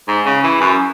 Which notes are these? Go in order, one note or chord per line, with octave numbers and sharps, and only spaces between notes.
G#2
C#3
E3
F#2